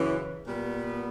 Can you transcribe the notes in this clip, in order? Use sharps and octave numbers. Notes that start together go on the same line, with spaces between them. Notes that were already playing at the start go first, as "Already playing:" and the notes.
Already playing: F#2 C#3 E3
A#2 G3 B3